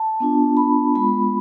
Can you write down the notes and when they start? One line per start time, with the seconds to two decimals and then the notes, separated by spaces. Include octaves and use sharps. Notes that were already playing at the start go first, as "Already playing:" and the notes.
Already playing: A5
0.20 B3 D4 F4
0.57 B5
0.95 G#3 B3 F4 B5